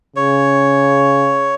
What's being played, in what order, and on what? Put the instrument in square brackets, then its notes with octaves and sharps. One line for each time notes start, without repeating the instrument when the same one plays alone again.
[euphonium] C#3 [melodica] C#5